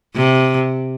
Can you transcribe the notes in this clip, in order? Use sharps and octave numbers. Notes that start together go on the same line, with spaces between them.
C3